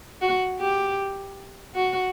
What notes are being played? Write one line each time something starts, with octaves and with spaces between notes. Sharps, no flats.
F#4
G4
F#4